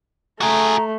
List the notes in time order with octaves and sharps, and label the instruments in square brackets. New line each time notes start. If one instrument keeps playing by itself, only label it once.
[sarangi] A3 [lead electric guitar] F#4 G#4 [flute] A#5